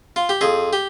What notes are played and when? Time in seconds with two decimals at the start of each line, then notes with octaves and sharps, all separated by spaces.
0.16 F4
0.29 G4
0.41 F2 G#4
0.73 G4